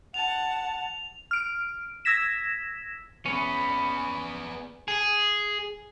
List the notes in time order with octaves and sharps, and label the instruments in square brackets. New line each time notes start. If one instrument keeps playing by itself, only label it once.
[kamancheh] F#5 A5 [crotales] F7
[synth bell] F6 D7
E6 G#6 A#6 B6 E7
[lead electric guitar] B3 G#4 [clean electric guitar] C#4 [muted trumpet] B5
[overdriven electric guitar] G#4